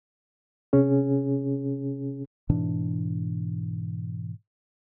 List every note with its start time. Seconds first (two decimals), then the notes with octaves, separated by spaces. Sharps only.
0.73 C3 C#4 G#4
2.49 G#2 B2 E3 D4